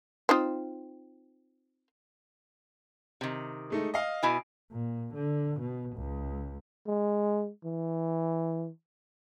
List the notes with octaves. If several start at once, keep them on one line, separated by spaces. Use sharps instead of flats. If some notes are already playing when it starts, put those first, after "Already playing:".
C4 D#4 F4
C3 D#3
G#3 A3 D#4
D#5 F5
B2 E4 G#5
A#2
D3
B2
C#2
G#3
E3